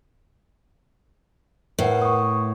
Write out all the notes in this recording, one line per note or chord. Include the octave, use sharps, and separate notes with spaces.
A2 A#4 B4 F#5
C#6 D#6